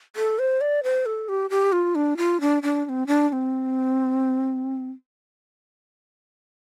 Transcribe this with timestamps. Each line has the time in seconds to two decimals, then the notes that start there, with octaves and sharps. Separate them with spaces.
0.16 A4
0.39 C5
0.61 D5
0.83 C5
1.06 A4
1.29 G4
1.50 G4
1.72 F4
1.95 D4
2.17 F4
2.41 D4
2.63 D4
2.85 D4
2.89 C4
3.07 D4
3.29 D4
3.32 C4